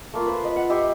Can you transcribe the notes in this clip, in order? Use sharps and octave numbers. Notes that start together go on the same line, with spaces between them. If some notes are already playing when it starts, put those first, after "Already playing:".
A3 A#3 F4
B4 C5
B4 D#5
F#5
G4 D#5 E5 C6